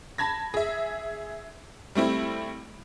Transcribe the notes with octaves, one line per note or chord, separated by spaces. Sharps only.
A5 B5 G#6 A#6
G#4 E5
G3 A3 C4 E4